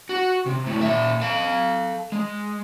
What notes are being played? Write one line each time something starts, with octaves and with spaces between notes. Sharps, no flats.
F#4
C3
D2 A2
A#2 E5
A4 F5
G#3